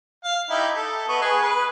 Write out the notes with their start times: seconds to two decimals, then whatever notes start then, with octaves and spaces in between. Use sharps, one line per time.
0.24 F5
0.50 D#4 E4 G4
0.74 A4
1.08 B3 D#5 C#6
1.22 G#4 B4
1.42 B4